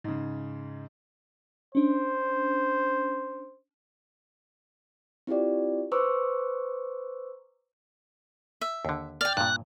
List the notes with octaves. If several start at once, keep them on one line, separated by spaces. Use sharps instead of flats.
G#2 C#3
C#4 D4 C5
C4 E4 F4 G4 D5
B4 C5 A#5 C#6 D6 E6
E5
D#2 D3
D5 G5 F6
G2 A#2 F#6